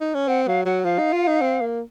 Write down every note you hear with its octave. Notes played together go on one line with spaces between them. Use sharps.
D#4
C#4
C4 F#5
F#3 F5
F#3 F#5
F3 F5
D#4
F4
D#4
C4
A#3